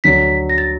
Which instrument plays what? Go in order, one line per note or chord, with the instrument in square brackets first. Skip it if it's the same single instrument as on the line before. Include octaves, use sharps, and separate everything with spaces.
[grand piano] D2 D3 F#3 [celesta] B6
[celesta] A#6
A6